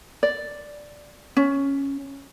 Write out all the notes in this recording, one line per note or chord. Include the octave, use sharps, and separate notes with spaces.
D5
C#4